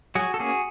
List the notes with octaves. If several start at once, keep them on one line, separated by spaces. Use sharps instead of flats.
F#3 F#4 G#4
A4
A#3 C#4 F#4 G#4